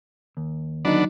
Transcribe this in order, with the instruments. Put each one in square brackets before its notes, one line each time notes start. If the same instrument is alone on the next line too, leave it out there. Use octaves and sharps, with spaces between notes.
[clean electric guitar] D#2
[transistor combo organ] D3 B3 D4 [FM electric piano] F#3 D#4